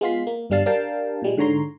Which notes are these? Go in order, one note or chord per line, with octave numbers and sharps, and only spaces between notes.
G#3 B3 F4 C6 B6
A#3
G1 G2 G3 D4 F5 A5
D4 G4 A#4 F5 G5 A5
A#2 G3 G#3
G#2 D3 C#5 A#5 C6